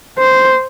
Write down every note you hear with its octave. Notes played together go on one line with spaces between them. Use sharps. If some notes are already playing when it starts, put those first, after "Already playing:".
C5